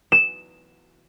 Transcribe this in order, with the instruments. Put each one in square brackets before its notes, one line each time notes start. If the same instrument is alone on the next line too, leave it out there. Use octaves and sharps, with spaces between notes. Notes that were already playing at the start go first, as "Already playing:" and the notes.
[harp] E7